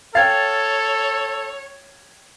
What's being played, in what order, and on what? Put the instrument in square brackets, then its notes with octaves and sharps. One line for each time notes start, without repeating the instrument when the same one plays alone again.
[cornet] A4 [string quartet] C#5 [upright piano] F5 G5 [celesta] G#6 A6